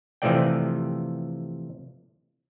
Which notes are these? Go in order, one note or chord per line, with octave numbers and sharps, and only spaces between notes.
C3 E3 F3 A3 D5 G5